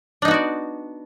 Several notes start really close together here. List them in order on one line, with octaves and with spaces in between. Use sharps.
D4 D#4 B3 F#4 D5